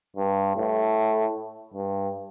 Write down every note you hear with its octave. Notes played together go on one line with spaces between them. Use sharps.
G2
A2
G2